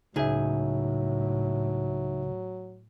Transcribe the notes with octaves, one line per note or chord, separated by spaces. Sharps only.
C#2 A2 F#3 D#4 G#4 E5